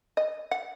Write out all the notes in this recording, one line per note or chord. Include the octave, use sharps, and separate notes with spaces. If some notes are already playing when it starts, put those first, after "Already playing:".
D#5
F#5